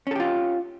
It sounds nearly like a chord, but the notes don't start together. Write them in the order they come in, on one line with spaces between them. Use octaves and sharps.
C#4 A4 G4 F4